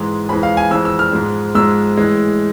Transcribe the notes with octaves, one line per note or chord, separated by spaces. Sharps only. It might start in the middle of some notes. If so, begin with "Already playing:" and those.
Already playing: G#2 E3 G#3 C6
F2 E3 G#3 B5
F5
G#5
F2 E3 G#3 E6
E6
F6
G#2 F3 G#3
G#2 F3 G#3 E6
A2 E3 G#3